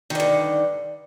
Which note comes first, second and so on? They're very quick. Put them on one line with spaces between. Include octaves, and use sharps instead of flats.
D#3 D3 G2